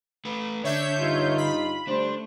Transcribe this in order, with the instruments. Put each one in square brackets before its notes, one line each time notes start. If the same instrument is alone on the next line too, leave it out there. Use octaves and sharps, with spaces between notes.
[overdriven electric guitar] A3 B4
[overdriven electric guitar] D3 [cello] D4 [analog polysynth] C#5 E5 G6
[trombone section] G2 D#4 [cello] F4
[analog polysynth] B5
[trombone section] D3 G3 C5 [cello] A3 [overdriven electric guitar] D4